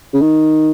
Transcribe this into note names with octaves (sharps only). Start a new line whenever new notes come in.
C#3
D#3